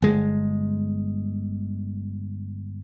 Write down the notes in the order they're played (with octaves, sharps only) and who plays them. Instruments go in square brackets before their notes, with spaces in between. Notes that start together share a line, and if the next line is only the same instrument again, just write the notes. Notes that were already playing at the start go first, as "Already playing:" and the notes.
[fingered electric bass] G1 G#3